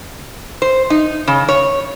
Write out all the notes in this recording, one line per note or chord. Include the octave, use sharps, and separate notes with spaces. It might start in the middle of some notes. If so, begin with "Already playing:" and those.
C5
D#4
C#3
C#5